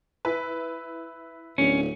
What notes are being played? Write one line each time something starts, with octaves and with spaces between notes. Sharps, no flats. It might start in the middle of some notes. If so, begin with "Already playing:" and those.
E4 B4
D1 C#4